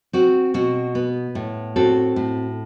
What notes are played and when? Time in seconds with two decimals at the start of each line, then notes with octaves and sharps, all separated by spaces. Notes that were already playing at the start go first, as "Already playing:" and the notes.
0.13 C4 F#4
0.54 B2 F#4
0.95 B3
1.35 A2
1.76 C4 F#4 A4
2.16 A2